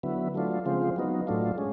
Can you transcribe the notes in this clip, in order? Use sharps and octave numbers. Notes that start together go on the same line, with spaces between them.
D3 F#3 B3 E4
F#3 A3 D4 F4
C#3 F3 G#3 C4 F4
F#3 B3 D#4
A2 F#3 A3 D4 F4
G#3 C#4